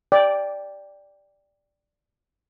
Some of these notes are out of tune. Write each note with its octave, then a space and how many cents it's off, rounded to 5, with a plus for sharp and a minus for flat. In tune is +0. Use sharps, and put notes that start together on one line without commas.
D5 +0 G5 +10